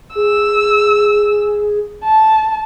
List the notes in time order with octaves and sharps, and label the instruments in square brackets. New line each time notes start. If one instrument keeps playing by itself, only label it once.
[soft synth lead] G#4 [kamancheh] E6
[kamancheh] A5